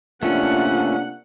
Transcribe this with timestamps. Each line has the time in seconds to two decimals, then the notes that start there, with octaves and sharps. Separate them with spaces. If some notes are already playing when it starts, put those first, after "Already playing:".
0.23 C3 A3 A#3 C#4 D4 F4 F#5